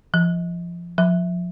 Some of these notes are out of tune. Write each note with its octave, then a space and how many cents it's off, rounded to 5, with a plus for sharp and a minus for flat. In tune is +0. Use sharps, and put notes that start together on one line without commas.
F3 -15
F3 +25